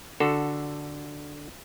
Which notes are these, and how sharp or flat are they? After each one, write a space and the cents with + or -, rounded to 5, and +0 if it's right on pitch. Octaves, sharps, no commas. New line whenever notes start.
D3 +0 F#4 +0 A4 +0